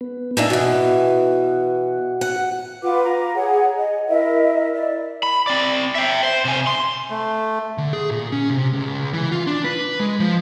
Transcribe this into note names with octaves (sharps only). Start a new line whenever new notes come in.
B3
A#2 D4 D#4 E5
B2 E3 F#4
F#5
F4 B4 F#5 D6
A#5
G#4 C#5 F#5
D#5
E4 A#4 D#5 E5
D5
B5
C4 D5
E5 G5
C5
C3 G#5
C6
A3
D3
G#4
A#2
C#4
C3
C#2
E3
F4
D4
B4
G#3
F3